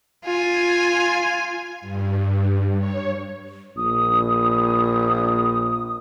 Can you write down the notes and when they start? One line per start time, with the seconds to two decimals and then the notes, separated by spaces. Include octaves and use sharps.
0.25 F4 G#5
1.81 G2
2.78 C#5
3.77 A#1 D#6